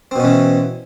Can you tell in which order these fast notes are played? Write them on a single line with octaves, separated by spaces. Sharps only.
C4 B2 C#4 E3